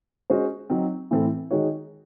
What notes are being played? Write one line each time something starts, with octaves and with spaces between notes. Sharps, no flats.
G#3 C#4 F#4 C5 D#5
F#3 C4 D#4
A2 E3 C4 E4 A4
D#3 G#3 D#4 F#4 C#5